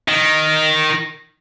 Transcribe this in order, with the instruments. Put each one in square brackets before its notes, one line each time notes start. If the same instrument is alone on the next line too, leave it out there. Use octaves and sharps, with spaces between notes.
[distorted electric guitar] D#3